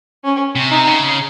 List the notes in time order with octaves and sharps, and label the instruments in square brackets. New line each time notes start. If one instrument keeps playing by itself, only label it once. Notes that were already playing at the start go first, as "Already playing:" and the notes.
[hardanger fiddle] C#4
[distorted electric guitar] C3
[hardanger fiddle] D#4
[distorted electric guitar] C#3